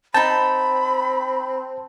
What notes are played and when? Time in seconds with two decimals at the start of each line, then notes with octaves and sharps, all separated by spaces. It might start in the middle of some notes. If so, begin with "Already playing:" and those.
0.14 C4 D#4 G5 A5 B5